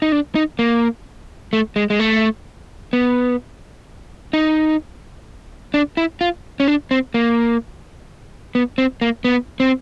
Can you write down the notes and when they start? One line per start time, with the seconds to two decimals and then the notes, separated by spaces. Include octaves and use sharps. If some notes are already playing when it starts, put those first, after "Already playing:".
0.02 D#4
0.12 D4
0.35 D#4
0.59 A#3
1.53 A3
1.76 G#3
1.90 G#3
2.00 A3
2.93 B3
4.33 D#4
5.74 D4
5.97 E4
6.21 F4
6.60 C#4
6.68 D4
6.91 C4
7.14 A#3
8.55 B3
8.78 C4
9.01 A#3
9.25 B3
9.60 C4